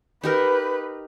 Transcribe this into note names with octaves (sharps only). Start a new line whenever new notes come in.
D#4 G4 A#4 B4